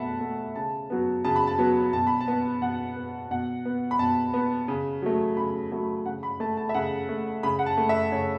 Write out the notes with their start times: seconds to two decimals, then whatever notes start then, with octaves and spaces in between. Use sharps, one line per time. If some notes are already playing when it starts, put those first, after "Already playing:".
Already playing: B2 A3 E5 F#5 A5 B5
0.21 A3
0.56 C#3 A5
0.90 F#3 B3
1.24 C#3 A5
1.36 B5
1.47 A5
1.59 F#3 B3
1.93 B2 A5
2.07 B5
2.21 A5
2.28 B3
2.62 B2 F#5
2.96 B3
3.31 B2 F#5
3.65 B3
3.91 B5
3.99 B2 A5
4.34 B3
4.68 C#3
5.02 F#3 A3
5.37 C#3 B5
5.71 F#3 A3
6.06 C#3 F#5
6.23 B5
6.40 A3 A5
6.57 A5
6.69 E5
6.74 C#3 F#5
7.09 A3
7.43 C#3 B5
7.59 F#5
7.66 A5
7.77 A3
7.89 E5
8.12 C#3 C#5